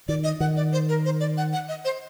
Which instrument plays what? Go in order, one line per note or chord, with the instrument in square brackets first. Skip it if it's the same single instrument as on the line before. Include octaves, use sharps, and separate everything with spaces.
[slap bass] D#3 [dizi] D5
[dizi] D#5
[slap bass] D#3 [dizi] F#5
[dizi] D5
C5
A#4
C5
D5
F#5
F#5
D#5
C5